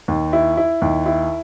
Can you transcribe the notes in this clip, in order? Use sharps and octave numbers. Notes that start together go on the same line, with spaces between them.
D#2
E4
E4
D#2
E4